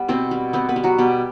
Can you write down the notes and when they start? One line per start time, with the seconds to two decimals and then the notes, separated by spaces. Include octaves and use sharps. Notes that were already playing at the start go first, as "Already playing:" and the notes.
Already playing: G3 B3
0.08 B2 C4 C5
0.31 G3
0.53 B3 C4 C5
0.69 B3 B4
0.76 G3
0.83 F#3 F#4
0.98 B2 G3 G4